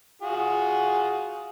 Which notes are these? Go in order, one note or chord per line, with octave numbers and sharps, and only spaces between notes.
F4 F#4 G#4